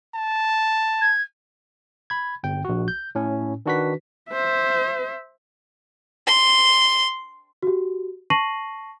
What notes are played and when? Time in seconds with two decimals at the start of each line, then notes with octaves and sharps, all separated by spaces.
0.15 A5
1.01 G#6
2.10 B5 G#6
2.44 G1 G5
2.65 A#1 F#4
2.88 G6
3.15 A2 C#4
3.66 D#3 D4 F#4 B4 B6
4.30 C5 E5
6.27 C6
7.63 F#4 G4
8.30 A5 C#6 A#6 C7 D#7 F#7